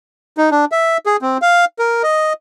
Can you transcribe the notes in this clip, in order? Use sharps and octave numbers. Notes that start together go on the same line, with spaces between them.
D#4
D4
E5
G#4
C4
F5
A#4
D#5